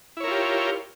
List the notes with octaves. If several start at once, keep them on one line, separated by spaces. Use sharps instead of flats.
E4 F4 G4 A#4 C#5